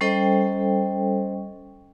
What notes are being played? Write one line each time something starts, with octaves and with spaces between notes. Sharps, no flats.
G3 C#4 A4 C5 D#5 G5